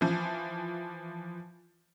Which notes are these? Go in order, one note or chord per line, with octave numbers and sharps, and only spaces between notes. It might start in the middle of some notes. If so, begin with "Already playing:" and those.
E3 F3